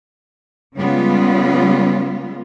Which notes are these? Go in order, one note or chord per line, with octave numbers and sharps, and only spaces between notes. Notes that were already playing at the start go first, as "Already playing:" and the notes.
C#3 G3 G#3 B3 C#4 F4